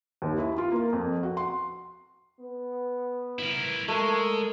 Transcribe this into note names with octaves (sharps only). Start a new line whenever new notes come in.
D#2
E4
F4
A#3
F2
F#4
C6
B3
E4 A#4
G#3 A3 A#4